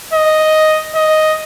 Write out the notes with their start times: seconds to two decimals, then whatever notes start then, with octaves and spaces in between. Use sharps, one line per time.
0.13 D#5
0.95 D#5